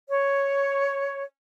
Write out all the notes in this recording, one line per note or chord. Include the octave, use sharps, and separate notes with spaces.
C#5